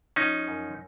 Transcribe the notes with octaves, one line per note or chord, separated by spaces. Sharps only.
F3 C#4 D#4
F#2